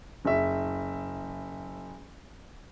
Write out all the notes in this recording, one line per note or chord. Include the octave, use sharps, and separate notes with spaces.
F#1 E5